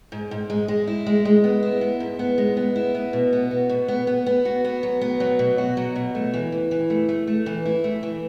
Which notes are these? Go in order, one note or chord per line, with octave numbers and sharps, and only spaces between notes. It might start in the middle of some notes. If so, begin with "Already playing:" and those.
G#2
G#2
G#3
G#3
E4
G#3
G#3
B3
E4
B3
G#2
B3
G#3
B3
E4
B3
B2
B3
F#4
B2
B3
B3
B3
F#4
B3
F#3
B3
F#3
B2
F#4
F#3
B2
A3
E3
E3
E3
A3
A3
A3
E3
E4
A3
E3